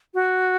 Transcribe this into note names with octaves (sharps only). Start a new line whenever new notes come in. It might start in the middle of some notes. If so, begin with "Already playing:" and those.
F#4